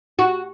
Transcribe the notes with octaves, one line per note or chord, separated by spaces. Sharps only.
F#4